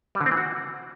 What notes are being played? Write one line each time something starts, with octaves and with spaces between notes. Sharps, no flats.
G3
D3
C4
E3
F#4